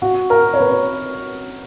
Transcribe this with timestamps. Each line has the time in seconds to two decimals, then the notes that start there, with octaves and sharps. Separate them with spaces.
0.02 F#4
0.30 A#4
0.54 C#5
0.60 B4